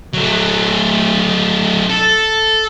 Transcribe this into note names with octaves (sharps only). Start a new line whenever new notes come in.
F#3 A3
A4